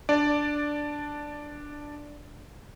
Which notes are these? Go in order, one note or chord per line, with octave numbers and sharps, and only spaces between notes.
D4 D5